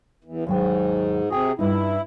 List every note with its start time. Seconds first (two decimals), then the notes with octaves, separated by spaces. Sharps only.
0.24 E2
0.47 D#2 G#2 F#3 G5
1.30 C3 F#4 G#4 G5
1.59 G2 D#4 E4